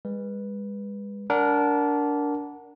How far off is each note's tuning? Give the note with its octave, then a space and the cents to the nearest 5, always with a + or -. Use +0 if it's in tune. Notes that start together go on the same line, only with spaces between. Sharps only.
G#3 -40 B4 -10
D4 -20 A#4 +0 F#5 +0